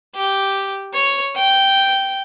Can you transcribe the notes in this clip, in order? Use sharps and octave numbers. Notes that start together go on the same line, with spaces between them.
G4
C#5
G5